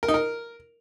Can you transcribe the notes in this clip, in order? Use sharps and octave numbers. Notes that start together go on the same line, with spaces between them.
A#4
D#4
A#4